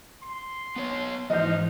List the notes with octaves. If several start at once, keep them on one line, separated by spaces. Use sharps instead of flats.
C6
B3 B4 C#5
G#2 E3 F3 D#4 F#4 D#5 F5 G6